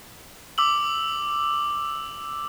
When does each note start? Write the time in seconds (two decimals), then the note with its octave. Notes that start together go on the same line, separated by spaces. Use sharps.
0.58 D6 E6 F#7